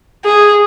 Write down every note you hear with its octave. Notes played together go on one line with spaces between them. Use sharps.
G#4